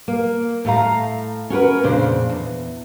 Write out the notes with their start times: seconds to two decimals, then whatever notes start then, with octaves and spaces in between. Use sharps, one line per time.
0.08 A#3
0.65 A2 A3 F5 A#5
1.50 C#4 F#4 A#4 B4
1.83 F2 A#2 C#3 D4 C5
2.30 E2